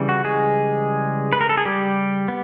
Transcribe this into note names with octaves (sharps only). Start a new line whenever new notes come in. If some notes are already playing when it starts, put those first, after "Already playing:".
Already playing: C#3 E3 G3
F#4
G#3 G#4
B4
A#4
A4
G#4
G3 G4
B3